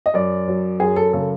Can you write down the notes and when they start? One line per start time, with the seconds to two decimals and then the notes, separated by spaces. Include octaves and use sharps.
0.06 D#5
0.14 F#2 D5
0.48 F#3
0.80 F#2 G#4
0.96 A4
1.13 C#3 A4